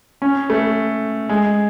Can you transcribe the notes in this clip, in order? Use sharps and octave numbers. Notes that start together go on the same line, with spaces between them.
C#4
A3
G#3